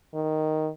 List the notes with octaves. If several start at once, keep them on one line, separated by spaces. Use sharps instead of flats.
D#3